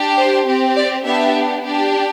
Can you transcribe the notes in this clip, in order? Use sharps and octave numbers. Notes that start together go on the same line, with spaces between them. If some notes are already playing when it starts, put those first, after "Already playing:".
Already playing: D4 G4
C5
C4 G4
D5
B3 D4 G4 E5
D4 G4